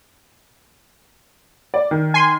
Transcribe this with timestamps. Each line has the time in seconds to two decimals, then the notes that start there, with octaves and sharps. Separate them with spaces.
1.74 D5
1.91 D#3
2.14 G#5 C6